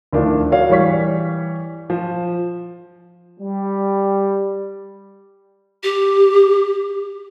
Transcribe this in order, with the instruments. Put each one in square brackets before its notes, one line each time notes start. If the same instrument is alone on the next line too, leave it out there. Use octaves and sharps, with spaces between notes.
[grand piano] D2 D#3 F3 D4 E4 F4
F#4 A#4 C#5 D5 F5
E3 G3 C#5 C#6 B6
F3
[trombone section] G3
[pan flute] G4